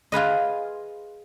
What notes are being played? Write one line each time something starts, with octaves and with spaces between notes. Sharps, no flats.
F4 G#4 B4 D#5